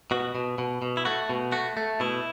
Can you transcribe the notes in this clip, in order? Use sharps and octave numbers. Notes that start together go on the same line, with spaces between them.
B2 F#4
B2
B2
B2
E4
A3 F#4
B2
A3 F#4
A3
B2 E4